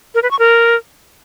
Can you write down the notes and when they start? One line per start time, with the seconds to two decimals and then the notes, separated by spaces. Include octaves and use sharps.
0.15 A#4
0.23 B4
0.31 C#6
0.39 A#4